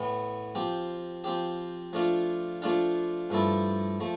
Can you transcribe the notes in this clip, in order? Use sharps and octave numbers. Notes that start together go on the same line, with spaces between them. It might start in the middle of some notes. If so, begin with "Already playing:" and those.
Already playing: A2 E3 B3
F3 C4 G4
F3 C4 G4
F3 A3 D4 F4
F3 A3 D4 F4
G2 F3 A3 E4 A4
F3 A3